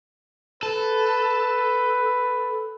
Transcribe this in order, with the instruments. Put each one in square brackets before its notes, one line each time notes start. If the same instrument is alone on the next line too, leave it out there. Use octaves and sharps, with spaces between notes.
[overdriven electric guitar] A4 [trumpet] B4